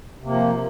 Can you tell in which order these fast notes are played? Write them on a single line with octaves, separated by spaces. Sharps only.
C3 A#3 F3